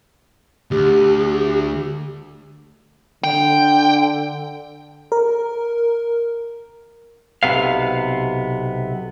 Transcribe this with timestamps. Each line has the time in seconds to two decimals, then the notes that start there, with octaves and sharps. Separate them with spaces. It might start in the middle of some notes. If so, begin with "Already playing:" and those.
0.71 D2 G4
3.24 D3 G5
5.12 A#4
7.43 B1 C3 B3 F5